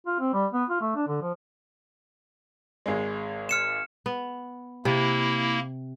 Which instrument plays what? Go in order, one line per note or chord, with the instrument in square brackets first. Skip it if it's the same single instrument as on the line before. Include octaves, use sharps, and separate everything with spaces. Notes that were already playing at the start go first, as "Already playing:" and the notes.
[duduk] F4
C4
G3
B3
F4
A3
D4
D3
F3
[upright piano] G#1 G#3
[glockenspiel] F6 C#7 E7
[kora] B3
[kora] C3 [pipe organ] A#3 E4